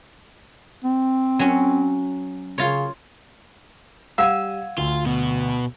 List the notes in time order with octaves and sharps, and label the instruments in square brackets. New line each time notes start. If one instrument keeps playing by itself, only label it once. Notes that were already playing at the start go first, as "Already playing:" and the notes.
[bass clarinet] C4
[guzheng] F#3 C#4
[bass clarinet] C#3 [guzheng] F4 C#5
[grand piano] G3 G#6 D#7 [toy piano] F5 F#5 [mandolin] E6
[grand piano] D2 [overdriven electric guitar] F4
[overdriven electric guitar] B2 B3